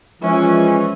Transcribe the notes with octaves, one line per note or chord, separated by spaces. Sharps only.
E3 F3 G#3 C#4